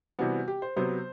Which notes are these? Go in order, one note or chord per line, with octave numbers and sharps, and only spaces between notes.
C3 E3 G3 B3 F#4
G4
C5
C3 F#3 B3 C5